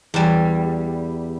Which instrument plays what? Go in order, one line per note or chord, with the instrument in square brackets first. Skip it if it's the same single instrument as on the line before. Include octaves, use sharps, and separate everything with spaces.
[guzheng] E2 G3